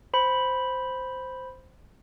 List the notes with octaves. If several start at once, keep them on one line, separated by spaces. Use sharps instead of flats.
C5 B5